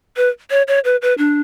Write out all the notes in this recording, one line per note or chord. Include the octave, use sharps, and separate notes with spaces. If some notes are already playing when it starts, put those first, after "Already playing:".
B4
C#5
C#5
B4
B4
D4